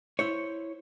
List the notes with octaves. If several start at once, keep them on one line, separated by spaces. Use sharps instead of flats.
E4 C5 C#5